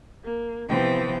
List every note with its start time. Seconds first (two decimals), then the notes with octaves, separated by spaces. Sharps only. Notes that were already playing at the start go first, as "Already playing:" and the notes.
0.24 A#3
0.69 C3 E3 F3 B3 C4 G5